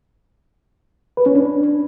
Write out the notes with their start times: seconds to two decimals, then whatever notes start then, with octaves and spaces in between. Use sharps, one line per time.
1.17 B4
1.26 C#4
1.35 D4